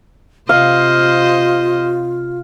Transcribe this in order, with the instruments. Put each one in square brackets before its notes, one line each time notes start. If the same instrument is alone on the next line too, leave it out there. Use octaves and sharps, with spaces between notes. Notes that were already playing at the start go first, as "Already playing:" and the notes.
[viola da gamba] C3 C5 D#5 [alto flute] F4 [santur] F5